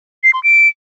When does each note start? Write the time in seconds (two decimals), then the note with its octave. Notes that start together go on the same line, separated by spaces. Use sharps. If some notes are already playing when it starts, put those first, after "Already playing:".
0.24 C7
0.33 C6
0.43 D7